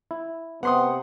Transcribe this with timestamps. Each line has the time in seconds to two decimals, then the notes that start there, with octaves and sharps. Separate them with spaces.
0.11 E4
0.63 C3 B3 F#5 C6 D#6